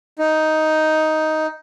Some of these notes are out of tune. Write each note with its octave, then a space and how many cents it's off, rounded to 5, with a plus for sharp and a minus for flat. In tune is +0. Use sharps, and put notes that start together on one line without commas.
D#4 +5